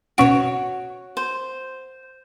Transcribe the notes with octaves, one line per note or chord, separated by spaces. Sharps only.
B2 C#4 F#4 C#5 D7
C5